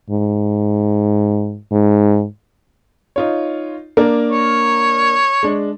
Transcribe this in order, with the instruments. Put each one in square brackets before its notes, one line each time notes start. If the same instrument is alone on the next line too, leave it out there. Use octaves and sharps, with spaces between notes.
[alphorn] G#2
G#2
[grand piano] D#4 F4 C#5
A#3 D4 A#4
[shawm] C#5
[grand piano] G#3 D4